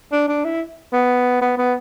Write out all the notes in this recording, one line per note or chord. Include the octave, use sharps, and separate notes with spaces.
D4
D4
E4
B3
B3
B3